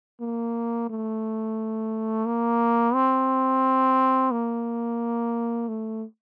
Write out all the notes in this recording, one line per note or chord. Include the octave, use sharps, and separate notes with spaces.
A#3
A3
A#3
C4
A#3
A3